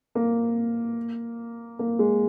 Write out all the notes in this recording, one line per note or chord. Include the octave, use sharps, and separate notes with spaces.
A#3
A#3
G#3